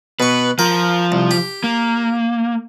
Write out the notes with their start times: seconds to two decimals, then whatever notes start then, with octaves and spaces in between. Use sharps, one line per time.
0.20 B2 B4 C#6
0.59 F3 F4 A#4
1.12 C2
1.31 G4
1.64 A#3